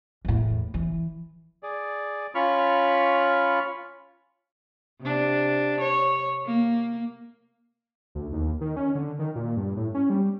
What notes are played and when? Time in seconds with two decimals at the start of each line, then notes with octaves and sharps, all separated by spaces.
0.25 E2 A2
0.74 E3
1.63 G#4 D5
2.35 C#4 F4 B5 C#6 F6
5.01 C3 D4
5.80 C#5
6.46 A#3
8.15 D2
8.33 D#2
8.61 D#3
8.76 C#4
8.95 D3
9.19 D#3
9.36 A#2
9.56 G2
9.77 A2
9.94 C#4
10.10 G3